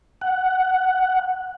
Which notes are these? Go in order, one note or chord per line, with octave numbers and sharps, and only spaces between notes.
F#5